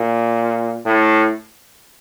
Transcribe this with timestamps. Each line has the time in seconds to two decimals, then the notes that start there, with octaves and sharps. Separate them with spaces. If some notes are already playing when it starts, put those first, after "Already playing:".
Already playing: A#2
0.85 A2